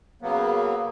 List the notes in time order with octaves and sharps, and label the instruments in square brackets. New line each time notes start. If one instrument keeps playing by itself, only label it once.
[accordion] C#3 F#3 A#3 B3